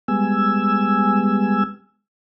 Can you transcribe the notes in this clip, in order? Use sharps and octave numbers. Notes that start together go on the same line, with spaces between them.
G3 G#3 B3 G#5 E6